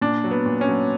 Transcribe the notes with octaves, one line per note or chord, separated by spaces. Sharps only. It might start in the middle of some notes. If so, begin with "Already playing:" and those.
A#2 D4
F#3
B3
A#2
C#4
F#3